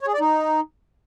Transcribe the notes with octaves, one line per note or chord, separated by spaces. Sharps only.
C#5
G#4
D5
D#4